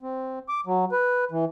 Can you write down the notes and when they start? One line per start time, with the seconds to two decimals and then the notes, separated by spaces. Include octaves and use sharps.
0.01 C4
0.49 D6
0.66 F#3
0.92 B4
1.31 E3